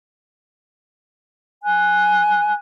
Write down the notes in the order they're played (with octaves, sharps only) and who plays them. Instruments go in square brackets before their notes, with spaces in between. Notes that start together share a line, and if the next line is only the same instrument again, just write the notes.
[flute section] G#5 F#6